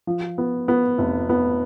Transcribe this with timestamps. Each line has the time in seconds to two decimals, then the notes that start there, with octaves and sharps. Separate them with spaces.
0.07 F3
0.38 B3
0.68 B3
0.98 F1
1.29 B3